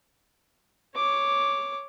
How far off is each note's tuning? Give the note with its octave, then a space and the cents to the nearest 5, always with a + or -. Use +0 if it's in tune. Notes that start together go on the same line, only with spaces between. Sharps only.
C#5 +0 D6 +0